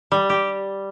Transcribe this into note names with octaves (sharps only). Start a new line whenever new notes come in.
G3
G4